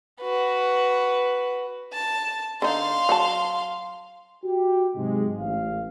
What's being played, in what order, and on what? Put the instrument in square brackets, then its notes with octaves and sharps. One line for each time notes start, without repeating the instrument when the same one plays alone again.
[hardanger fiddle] F#4 B4
[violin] A5
[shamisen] D3 D#4 [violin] F5 C6
[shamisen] F#3 F#5 A5
[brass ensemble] F#4 G4
G#2 C3 F#3 G#3
A1 F5